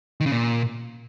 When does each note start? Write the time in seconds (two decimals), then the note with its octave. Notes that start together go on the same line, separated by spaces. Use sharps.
0.21 D#3
0.26 C#3
0.31 A#2